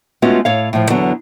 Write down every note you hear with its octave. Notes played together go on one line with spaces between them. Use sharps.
G#3 A3 B3 C#4 F4 F#4
A2 C#5 F5
A2 F3
E2 D3 F#3 B3